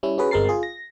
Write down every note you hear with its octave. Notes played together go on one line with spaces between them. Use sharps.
G3 C#4 E4
C#4 F#4 G#4 B4
G1 G#3 C4 A#4 A6 C7
F4 G#4
A#6